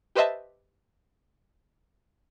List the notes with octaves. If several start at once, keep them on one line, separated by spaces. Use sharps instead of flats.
G4 B4 C5 D#5 E5 A5